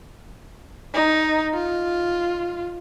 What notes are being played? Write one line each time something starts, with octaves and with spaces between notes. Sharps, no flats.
D#4
F4